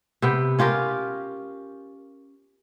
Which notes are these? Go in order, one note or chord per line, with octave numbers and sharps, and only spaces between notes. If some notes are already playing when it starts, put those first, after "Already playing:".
C3 B3 G5
C#4 F4 G4 A#4